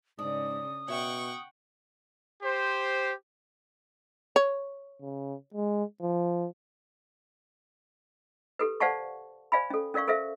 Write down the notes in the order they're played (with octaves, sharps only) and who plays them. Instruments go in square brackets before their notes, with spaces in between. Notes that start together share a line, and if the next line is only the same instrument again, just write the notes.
[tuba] G#2 [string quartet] C#3 [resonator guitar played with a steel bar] D4 [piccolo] D#6
[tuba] B2 [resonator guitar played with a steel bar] C#5 E5 [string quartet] F#5 G5 C#6
[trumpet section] G4 C5
[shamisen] C#5
[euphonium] C#3
G#3
F3
[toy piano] G4 A4 B4
C5 D5 F5 F#5 A5 C#6
C5 D5 F5 G#5 B5
C#4 A4
C#4 A#4 D5 F5 C#6
A4 A#4 C5 E5 F5